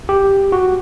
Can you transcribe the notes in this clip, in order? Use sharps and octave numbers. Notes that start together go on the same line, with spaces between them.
G4
F#4